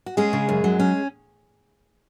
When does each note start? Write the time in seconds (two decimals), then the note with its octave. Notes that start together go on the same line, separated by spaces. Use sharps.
0.06 F#4
0.17 G#3 C#4 G#4
0.33 C#3
0.49 F#2
0.64 F#3
0.80 C#4